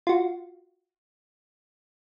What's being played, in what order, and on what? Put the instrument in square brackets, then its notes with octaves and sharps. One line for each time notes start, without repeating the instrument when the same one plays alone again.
[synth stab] F4 F#4